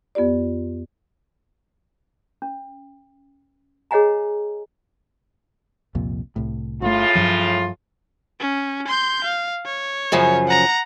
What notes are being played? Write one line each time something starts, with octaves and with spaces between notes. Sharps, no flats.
F2 B3 F4 G4 D5
C#4
G#4 C#5 D#5 F#5 G#5 A#5
C2 F2 A#2
C2 A2
G1 A2 C#3 A3 F4
G2 F3 F#3
C#4
C6 G6
F5
C#5
F#2 C#3 F3
F#5 A#5